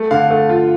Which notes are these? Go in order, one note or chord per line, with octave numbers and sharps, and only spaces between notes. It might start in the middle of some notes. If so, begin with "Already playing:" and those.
Already playing: A3
D3 F5
A3
F4